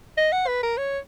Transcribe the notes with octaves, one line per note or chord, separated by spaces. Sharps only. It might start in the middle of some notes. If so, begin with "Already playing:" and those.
D#5
F#5
B4
A#4
C#5